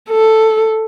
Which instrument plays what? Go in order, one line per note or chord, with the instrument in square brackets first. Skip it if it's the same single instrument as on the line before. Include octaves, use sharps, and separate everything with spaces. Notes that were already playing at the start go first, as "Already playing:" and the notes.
[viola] A4